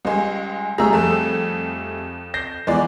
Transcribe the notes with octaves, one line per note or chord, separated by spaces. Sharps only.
C#2 G3 G#3
G3 A3 G#4 A#5 E6
F2 A4
G6 A#6 C7
E2 E3 G#3 B3 D5